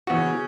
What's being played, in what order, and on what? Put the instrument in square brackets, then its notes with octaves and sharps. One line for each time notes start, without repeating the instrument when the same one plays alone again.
[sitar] C#3 [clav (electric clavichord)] E3 B3 F#4